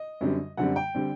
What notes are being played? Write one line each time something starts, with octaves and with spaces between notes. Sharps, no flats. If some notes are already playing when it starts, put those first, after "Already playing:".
Already playing: D#5
F#2 D3 G3 C4
F#2 D3 G3 C4 F#5
G5
D3 G3 C4